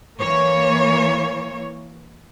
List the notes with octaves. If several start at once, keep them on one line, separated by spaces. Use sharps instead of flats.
E3 A#3 C#5